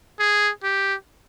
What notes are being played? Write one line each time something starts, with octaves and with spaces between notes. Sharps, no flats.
G#4
G4